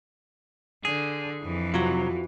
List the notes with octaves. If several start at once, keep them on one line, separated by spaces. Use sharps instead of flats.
D3 G#4
F2 E3
C3 F#3 F4 F#4